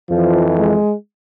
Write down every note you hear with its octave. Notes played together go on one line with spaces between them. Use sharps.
F2 E3 F3
G#3